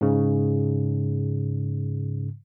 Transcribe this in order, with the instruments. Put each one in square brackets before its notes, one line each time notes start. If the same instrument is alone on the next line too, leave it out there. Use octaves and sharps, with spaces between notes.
[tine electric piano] G#2 C#3